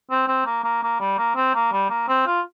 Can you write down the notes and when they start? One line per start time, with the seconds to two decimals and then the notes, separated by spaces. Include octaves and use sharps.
0.10 C4
0.28 C4
0.46 A#3
0.64 A#3
0.83 A#3
1.00 G3
1.18 A#3
1.36 C4
1.55 A#3
1.72 G3
1.90 A#3
2.08 C4
2.26 F4